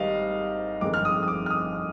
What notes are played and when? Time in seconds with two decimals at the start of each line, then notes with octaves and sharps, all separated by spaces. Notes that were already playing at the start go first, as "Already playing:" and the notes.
Already playing: G#1 G#2 D#3 G3 D#5 F5
0.81 G1 F2 D#3 G#3 C4 D6
0.94 F6
1.05 D#6
1.23 D#6
1.28 D6
1.46 F6
1.50 D#6